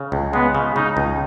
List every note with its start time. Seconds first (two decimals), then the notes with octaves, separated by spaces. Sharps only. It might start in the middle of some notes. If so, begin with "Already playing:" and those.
Already playing: C#3
0.12 C#2
0.33 G#3 B3
0.55 C#3
0.76 C#3 D#4
0.97 C#2